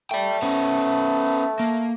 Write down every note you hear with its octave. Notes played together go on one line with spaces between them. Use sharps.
A3 D5 G5
B3 C#4
A#3